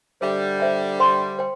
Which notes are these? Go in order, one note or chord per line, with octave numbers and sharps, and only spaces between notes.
D3 G3 C5 E5 G5
C5 E5 G5
C5 G5 C6
C5 G5